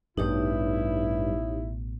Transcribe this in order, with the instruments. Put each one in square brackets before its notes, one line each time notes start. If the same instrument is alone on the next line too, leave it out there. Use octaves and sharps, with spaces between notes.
[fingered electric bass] A1 B2 [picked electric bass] G2 [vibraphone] D#4 G4 C#5 [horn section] E4